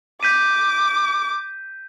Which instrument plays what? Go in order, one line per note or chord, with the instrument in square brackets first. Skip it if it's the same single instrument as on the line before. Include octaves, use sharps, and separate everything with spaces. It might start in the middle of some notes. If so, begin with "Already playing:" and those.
[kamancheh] D6 [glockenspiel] G6 B6 D#7